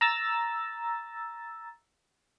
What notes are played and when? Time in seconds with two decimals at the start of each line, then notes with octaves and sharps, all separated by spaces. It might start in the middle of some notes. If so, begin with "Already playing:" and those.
0.01 A#5 E6 A6